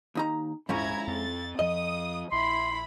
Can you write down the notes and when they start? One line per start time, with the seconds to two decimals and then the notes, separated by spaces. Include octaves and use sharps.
0.15 D#2 D#4 A#5
0.69 D#1 G#2 F3 G#3 C#4 E4 A#5 G#6
1.07 F2 C4 A6
1.59 F2 F3 D#5 D#6
2.32 A#1 E4 B5 C6